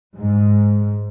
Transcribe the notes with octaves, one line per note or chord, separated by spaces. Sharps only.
G#2